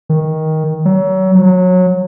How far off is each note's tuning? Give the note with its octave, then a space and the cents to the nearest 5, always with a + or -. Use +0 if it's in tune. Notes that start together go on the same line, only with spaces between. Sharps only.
D#3 +15
F#3 +30
F#3 -20